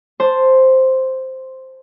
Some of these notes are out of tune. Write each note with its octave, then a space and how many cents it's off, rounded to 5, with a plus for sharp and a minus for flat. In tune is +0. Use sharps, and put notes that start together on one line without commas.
C5 +0 A5 +0